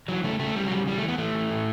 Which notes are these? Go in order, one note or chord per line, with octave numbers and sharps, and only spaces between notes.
E3 F#3
C#3 A3
C#3 A3
C#3 G3
F#3
C#3 G3
E3 G3
E3 A3
B3
E3 A3
E3
A2